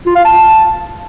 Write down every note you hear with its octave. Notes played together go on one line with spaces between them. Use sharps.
F4
F5
A5